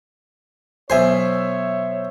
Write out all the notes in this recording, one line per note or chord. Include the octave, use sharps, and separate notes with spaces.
B1 C5 C#5 E5 G#5 C6